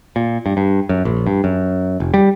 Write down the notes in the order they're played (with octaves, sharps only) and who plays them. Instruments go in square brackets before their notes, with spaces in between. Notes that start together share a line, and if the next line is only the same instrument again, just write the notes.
[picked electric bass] A#2
G2
G2
F#2
A#1
G2
F#2
F1
G3